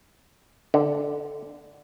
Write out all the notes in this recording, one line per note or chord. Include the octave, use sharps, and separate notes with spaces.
D3